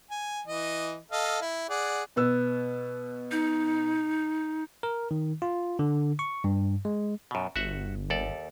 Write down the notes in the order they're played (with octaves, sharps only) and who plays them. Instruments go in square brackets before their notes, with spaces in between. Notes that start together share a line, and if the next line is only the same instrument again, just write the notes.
[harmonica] G#5
E3 D#5
A4 D#5 F5
E4
G#4 D5 F#5
[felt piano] B2 B3 E6
[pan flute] D#4
[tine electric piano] A#4
D#3
F4
D3
C#6
G2
G#3
[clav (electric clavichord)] F#2 B2
[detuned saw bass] G1 [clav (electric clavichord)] F#4 E5 F#5
[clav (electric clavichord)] D#2 A4 D5